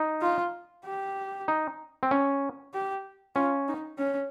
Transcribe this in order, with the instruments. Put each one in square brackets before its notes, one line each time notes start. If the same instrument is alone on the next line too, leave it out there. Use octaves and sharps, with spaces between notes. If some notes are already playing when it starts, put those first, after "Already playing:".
Already playing: [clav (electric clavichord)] D#4
[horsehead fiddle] F4
G4
[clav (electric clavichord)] D#4
C4
C#4
[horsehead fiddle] G4
[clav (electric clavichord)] C#4 [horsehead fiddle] F4
[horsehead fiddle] D#4
C#4